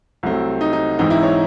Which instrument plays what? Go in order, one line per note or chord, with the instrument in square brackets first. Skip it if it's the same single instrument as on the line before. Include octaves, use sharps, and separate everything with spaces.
[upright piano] C2 C3 F#3 A3 C4
[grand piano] D#4
D#4
[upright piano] G#2 E3 C4 [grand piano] D#4
[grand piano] E4
C#5